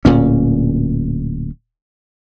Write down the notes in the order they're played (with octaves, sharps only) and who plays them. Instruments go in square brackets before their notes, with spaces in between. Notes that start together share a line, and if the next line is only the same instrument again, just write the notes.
[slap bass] D1 A#2 C#4